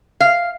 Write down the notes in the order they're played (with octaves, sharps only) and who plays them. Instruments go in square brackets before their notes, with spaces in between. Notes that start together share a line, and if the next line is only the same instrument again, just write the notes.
[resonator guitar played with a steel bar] F5